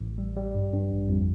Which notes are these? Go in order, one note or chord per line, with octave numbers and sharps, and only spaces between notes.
A1
G3
G3
G2
G2
A1
F2